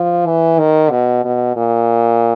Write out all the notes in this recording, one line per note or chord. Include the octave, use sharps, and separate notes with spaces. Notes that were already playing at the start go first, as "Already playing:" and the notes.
Already playing: F3
E3
D#3
B2
B2
A#2